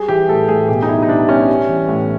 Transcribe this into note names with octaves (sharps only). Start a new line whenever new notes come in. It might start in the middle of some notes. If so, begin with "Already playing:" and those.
Already playing: G3 G#4
E3 G4
A2 A4
A2 G#4
B2 G4
D#4
G3 E4
D#4
B2 D4
G3 C#4
G3
E3
A2